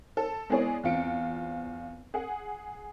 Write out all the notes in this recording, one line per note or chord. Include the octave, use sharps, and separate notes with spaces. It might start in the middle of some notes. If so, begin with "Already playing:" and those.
A4
G#3 B3 E4 G#4 C#5 D5
E2 C4 F4 C#7 D7
G#4 F#5